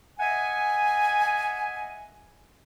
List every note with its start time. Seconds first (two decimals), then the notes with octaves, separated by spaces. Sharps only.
0.20 D#5 E5 F#5 G#5